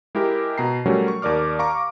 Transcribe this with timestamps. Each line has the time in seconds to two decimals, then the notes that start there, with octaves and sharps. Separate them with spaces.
0.15 G#3 E4 G4 A#4
0.58 B2 A#5 C7
0.86 F#3 G3 A3 C#4 F#4 A#4
1.08 C#6
1.22 D#2 A#4 D5 D6 F6
1.59 F5 A#5 C#6 D6